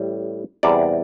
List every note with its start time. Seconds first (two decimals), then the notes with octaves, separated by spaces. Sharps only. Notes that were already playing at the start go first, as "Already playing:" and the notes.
Already playing: A1 A2 G3
0.63 E2 C3 G3 D5